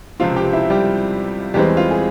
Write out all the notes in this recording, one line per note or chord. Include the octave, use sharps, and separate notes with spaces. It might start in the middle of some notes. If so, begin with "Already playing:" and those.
C#2 C3 F3 C4 F4 F5
G4 G5
E4 E5
G3 G4
E2 E3 G3 G#3 C4 G4
F4
G#4